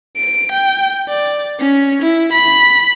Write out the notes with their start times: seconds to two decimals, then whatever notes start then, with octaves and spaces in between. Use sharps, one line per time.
0.16 D7
0.52 G5
1.08 D5
1.60 C#4
2.02 E4
2.32 B5